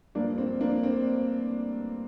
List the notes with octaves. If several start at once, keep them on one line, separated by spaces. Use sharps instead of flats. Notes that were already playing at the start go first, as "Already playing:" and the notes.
G2 F3 A#3 D4
C4
A#3 D4
C4